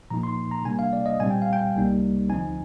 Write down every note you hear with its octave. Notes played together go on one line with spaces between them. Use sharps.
A#2 F3 A#3 D#4 A#5
C6
A#5
C3 G3 A#3 D4 G#5
F5
D5
D#5
A#2 G3 C4 G#5
G5
F5
G5
C2 C3 G3 A#3 D#4
D2 D3 F3 C4 D#4 G#5